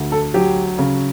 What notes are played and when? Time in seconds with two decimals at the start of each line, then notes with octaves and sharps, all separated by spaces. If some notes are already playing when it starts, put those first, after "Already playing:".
Already playing: D2
0.12 A4
0.34 F#3 G4
0.79 C#3